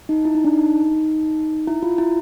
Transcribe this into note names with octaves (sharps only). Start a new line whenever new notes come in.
D#4
E4
D#4
D4
D#4
E4
F4
E4